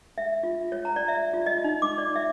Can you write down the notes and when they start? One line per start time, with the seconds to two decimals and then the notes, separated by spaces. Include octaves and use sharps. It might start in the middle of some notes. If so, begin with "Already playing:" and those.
0.18 E5
0.43 F4
0.72 C#5
0.85 A#5
0.96 D5
1.08 E5
1.33 F4
1.46 D#5
1.64 D#4
1.82 D6
1.98 D5
2.16 E5